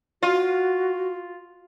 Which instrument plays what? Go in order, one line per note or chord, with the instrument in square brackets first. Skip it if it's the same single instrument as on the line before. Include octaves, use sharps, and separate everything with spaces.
[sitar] F4 [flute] F#4